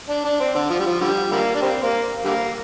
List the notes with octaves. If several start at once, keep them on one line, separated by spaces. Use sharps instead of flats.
D4
D4
C4
D3
F3
G3
F3
D3 G3
D3 G3 A#3
D4
G3 C4
A#3
D3 G3 A#3